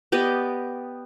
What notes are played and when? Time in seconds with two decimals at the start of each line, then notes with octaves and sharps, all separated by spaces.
0.12 B3 G4 D5 D#5